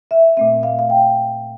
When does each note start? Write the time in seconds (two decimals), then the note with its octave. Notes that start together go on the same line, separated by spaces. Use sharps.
0.11 E5
0.37 A#2 A3 C4 E5
0.63 F5
0.79 F5
0.90 G5